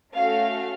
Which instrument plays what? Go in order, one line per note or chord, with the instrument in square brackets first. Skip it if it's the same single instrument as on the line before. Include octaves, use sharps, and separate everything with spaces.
[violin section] A3 C#4 F#4 A4 F5